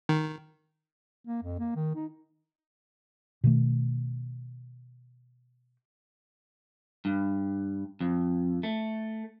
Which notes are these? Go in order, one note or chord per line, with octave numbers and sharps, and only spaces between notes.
D#3
A#3
F2
A#3
D#3
D#4
B2 D#3 A3
G2
F2
A3